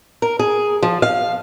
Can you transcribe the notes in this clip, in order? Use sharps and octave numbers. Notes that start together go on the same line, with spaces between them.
A#4
G#4
F3
F5